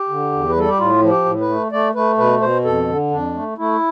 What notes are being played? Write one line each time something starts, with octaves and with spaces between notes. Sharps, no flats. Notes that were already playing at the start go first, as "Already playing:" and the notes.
Already playing: G4
D3
E2
B4
G3 A4
G4
A2 F4
F3
G4
A2
B4
A3
A3 D5
A3 B4
B2 B4
B2 C5
F2 A4
D3
F2 D4
A3
A3 E4